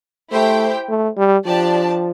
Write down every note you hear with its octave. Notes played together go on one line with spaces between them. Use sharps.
A3 E4 G4 C5 G5
A3
G3
F3 D4 G4 D5 A5